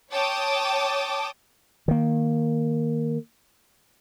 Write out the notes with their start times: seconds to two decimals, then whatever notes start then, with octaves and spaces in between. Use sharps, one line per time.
0.12 C#5 G5 A5 D6 D#6
1.88 D#3 A#3